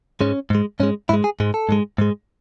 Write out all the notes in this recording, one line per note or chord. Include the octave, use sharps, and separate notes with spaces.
G#2 G#3 C#4
G#2 G#3
G#2 G#3 C#4
G#2 G#3 E4
G#4
G#2 G#3
A4
G#2 G#3
G#2 G#3